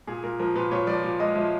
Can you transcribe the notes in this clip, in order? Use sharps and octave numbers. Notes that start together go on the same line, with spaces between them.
A#2 G#4
A#2 A#4
F3 A#4
A#2 B4
A#2 C#5
F3 D5
A#2
G#3 D#5
F3 E5